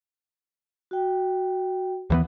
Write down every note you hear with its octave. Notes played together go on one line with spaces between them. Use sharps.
F#4 G5
D#2 E3 B3